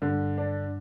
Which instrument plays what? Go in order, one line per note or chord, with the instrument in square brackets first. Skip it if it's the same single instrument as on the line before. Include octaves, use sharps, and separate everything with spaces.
[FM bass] G2 [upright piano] D3
[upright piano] D4